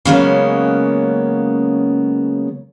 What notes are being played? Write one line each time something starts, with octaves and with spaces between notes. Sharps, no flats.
C#3 F#3 G#3 A#3 B3 C#4